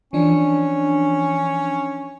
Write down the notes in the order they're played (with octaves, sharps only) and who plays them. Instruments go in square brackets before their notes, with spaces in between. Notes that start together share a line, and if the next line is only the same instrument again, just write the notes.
[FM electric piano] E3 F3 D4 [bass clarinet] C#4